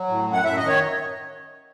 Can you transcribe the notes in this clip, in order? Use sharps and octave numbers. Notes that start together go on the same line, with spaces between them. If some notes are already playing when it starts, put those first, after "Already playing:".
Already playing: F#3
A2
F#2
F#5
F#2 E5
D#5
D#3
C#5